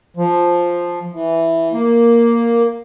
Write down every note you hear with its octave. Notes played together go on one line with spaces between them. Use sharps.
F3
E3
A#3